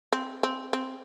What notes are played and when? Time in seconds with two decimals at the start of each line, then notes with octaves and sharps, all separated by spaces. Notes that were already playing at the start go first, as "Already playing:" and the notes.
0.13 C4
0.43 C4
0.73 C4